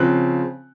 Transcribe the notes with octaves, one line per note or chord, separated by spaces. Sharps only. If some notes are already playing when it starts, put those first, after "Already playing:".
Already playing: C#3 F3 C4 F#6